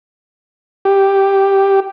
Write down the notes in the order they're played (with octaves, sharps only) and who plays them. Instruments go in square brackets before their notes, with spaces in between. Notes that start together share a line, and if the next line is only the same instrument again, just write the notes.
[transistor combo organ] G4